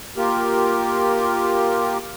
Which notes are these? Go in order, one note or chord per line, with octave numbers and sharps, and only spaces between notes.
A#3 F4 G4 A#4